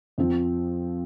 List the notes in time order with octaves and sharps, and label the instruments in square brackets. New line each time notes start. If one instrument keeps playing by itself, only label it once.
[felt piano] F2 F3 C4